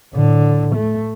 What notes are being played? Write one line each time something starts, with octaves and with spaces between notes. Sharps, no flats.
A2 D3
A3